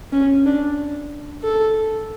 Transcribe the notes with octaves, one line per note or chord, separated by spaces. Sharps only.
C#4
D4
A4